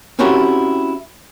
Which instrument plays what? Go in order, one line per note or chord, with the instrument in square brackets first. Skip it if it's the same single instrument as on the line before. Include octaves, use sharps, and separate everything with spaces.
[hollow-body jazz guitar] C4 C#4 E4 F#4 G4 A#4